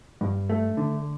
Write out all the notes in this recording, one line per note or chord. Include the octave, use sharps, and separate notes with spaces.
G2
A3
D3